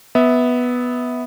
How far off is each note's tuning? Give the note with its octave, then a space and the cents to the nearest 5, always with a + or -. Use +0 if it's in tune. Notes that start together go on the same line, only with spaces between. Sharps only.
B3 +0 E5 -20